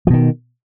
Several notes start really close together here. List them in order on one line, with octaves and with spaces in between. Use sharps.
F3 B2 D#3